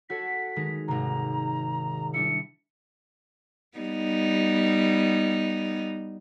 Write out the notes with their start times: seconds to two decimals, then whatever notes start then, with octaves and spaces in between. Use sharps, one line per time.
0.10 F#4 A4 C#5 B6
0.56 D#3 G#3 D#4
0.88 G#1 C3 A#5
2.14 G3 D4 E4 C#7
3.78 G3 B3 D#4